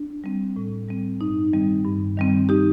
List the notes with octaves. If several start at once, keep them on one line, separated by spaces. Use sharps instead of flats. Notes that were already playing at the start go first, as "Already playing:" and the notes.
Already playing: D4
G3 C4
A2
G3 C4
G2 D#4
D#3 G3 C4
G2
D#3 G3 C4
D#4 G4